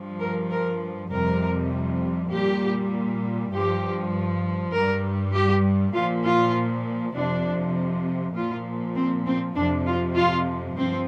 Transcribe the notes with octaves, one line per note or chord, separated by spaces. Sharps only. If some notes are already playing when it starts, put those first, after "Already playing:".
Already playing: G2 F3
A#4
A#4
F2 C3 G3 A#4
A#2 G3 G4
G2 F3 G4
G2 G3 A#4
G4
A#2 F3 F4
F4
F2 C3 F3 D4
A#2 F3 F4
C4
C4
F2 C3 F3 D4
F4
F4
G2 F3 C4